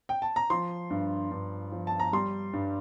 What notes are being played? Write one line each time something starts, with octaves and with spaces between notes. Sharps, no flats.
G5
A5
A#5
F3 C6
G2
G2
F3
A5
A#5
G3 C6
G2